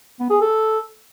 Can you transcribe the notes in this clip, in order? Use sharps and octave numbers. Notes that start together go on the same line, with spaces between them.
B3
G#4
A4